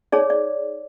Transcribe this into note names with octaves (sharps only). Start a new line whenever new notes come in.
D#4 G#4 C#5 D5
D5